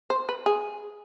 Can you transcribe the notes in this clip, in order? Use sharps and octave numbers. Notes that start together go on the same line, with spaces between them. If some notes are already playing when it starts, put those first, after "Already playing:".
C5
B4
G#4